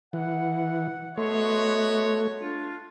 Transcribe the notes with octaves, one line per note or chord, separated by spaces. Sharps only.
E3 F#5
A3 B3 F#4 C#5 D#5 E5 C6
D4 F4